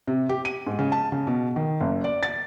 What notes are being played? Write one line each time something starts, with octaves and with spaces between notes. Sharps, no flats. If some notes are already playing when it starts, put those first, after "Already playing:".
C3
G4
D#7
G#2
C#3
A5
C#3
B2
D#3
F#1
D5
A6